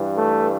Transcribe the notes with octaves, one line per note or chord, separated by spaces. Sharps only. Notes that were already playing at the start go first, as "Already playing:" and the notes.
Already playing: G2 E3
A3